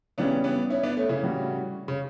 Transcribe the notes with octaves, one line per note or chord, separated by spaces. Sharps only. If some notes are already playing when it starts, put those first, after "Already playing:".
C#3 E3 G3 B3 C#4 D4
B3 D4
C#4 E4
B3 D4
A3 C#4
C#3 E3
A2 G3 C#4 F#4
C#3